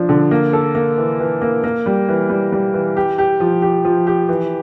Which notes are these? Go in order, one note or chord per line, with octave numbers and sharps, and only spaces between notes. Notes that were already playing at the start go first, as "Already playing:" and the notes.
Already playing: F3 D4
D3
A#3
A4
A#3
E3
E3
A#3
A#3
G3
E3
G3
G3
E3
G4
G4
F3
G4
F3
G4
E3